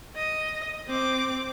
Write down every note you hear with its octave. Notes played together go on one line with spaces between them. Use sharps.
D#5
C4 D6